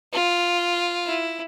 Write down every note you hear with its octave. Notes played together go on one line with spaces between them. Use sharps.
F4
E4